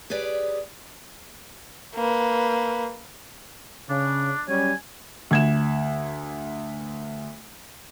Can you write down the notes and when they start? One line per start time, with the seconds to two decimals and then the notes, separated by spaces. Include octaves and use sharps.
0.10 G4 G#4 B4 C#5 D5
1.95 A#3 B4
3.90 C#3 D4
4.48 F#3 G3 C#4 G#5
5.31 D2 G#6 E7